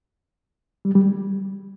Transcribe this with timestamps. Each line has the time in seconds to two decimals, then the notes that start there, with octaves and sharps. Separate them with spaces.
0.85 G3
0.95 G3